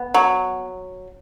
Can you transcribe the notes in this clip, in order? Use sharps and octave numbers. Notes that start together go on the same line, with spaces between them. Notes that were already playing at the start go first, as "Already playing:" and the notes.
Already playing: B3
F#3